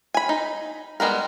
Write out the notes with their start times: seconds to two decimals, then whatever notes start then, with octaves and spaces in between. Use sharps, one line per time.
0.14 G#5 B5
0.29 D#4
1.00 G3 G#3 B3 A#4